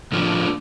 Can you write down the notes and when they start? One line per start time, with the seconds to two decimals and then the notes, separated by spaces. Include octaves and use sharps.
0.12 A2 F3 A3 D4 F4